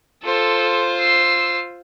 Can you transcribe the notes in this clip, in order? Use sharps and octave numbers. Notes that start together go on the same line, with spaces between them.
F4 A4 C5
E6 C7